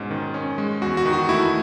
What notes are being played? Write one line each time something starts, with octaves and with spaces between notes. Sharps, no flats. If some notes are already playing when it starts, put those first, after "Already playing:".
Already playing: G#2 B2 C#4
D#3
C#4
G#3
E2 F#4
F#4
D#3
F#4
A3 E4